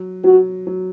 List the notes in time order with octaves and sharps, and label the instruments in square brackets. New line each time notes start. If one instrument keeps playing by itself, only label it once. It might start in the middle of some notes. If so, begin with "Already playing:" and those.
Already playing: [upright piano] F#3
[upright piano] F#3 [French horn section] F#4
[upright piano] F#3